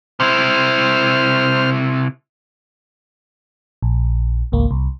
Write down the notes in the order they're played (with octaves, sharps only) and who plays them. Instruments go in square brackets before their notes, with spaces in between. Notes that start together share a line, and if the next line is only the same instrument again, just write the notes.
[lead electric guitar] C3 E4 [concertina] C5 F6
[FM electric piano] A#1
G#1 C#2 A#3
C2